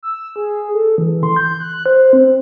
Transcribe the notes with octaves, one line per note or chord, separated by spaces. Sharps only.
E6
G#4
A4
E3
C6
G6
F#6
C5
C4